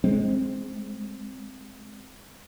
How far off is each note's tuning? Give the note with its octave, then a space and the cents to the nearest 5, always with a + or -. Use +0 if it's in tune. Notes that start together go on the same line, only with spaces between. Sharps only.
G#3 +5 C4 +0